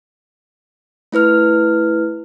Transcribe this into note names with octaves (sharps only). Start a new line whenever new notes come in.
A3 E4 B4 F6